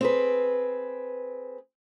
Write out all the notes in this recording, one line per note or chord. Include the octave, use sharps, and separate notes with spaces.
C4 G#4 B4